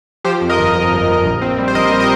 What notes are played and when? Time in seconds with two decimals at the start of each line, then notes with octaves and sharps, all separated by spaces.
0.24 F3 G4 C5
0.41 F2
0.49 A#4 D#5
0.58 G1
0.75 G1
0.92 G1
1.08 G1
1.25 A#1
1.41 C4
1.58 G3
1.68 C5
1.75 A#1 A#4 D#5
1.91 G3
2.00 A#4 D#5